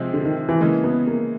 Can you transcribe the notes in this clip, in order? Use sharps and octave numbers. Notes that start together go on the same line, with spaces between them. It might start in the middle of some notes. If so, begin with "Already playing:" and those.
Already playing: C3 F3 G#3 C4
D3
D#3
E3
C#3 E3 G#3 A#3
B3
A#3